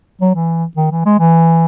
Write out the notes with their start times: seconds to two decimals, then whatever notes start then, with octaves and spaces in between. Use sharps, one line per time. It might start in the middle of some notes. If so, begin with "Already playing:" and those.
0.21 F#3
0.35 E3
0.77 D#3
0.91 E3
1.06 G#3
1.19 E3